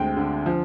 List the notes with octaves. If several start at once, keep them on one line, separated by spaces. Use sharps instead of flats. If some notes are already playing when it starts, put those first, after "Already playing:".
Already playing: D2 G#3 C4 G5
D3
F3